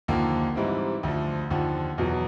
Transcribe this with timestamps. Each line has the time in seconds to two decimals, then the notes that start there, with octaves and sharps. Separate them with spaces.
0.08 D#2 D3 F3 A#3
0.55 G#2 E3 G3 C4 E4
1.03 D2 D3 F3
1.51 D#2 D3 F3
1.98 E2 B2 F#3